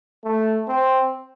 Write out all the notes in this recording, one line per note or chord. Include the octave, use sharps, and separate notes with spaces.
A3
C4